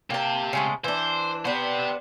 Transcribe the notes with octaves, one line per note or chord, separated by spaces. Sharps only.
C3 A#3 G4 A5
C#3 G#3 A3
E3 D4 C5
B3 D4 G4 C5